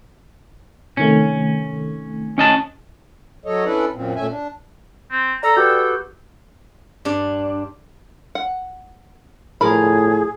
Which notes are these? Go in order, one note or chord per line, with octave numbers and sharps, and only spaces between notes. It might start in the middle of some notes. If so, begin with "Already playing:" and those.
C3 D#3 A3 C#4
C#4 D#5 A5
F#3 A4 C#5 D#5
C#4 D4 E4 A4 B4 D5
F#2 A#2 C4
A#2 A3 C#4 E5 G#5
D4
C4
A4 D5 A#5
F#4 G4 B4 G5
G2 D4
F#5
A2 F3 G#4 A#4 B5